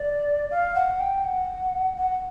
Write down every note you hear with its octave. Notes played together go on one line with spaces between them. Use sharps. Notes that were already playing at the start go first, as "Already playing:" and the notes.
Already playing: D5
F5
F#5
G5
F#5
F#5